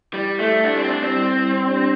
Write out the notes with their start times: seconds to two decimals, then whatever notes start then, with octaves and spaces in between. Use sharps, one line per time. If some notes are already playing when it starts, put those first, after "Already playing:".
0.14 G3 E4 G4 D5
0.39 A3
0.64 G3 D4 E4 G4
0.77 C4
0.89 D4
1.03 C4
1.16 G3 E4 C5
1.67 D4 G4 D5